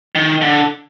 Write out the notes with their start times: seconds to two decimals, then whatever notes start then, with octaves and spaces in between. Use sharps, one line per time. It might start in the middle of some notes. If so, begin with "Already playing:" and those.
0.15 D#3
0.41 D3